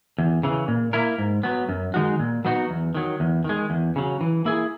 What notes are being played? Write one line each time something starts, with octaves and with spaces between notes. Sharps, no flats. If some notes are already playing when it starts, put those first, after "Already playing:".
E2
C#3 E3
A#2
A#3 E4 A#4
G#2
F#3 B3
F#2
D#3 G#3 D#4 F#4
A#2
F#3 B3 D#4 F#4
E2
D#3 F#3
E2
D#3 G#3
E2
C#3 F#3
E3
A#3 E4 G#4